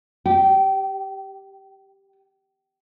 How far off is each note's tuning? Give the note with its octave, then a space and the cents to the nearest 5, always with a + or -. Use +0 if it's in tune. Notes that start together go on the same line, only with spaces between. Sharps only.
G4 +0 G5 -25